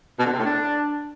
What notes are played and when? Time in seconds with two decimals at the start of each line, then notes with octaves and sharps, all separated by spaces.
0.19 B2
0.26 D3
0.32 C3
0.39 A2
0.45 D4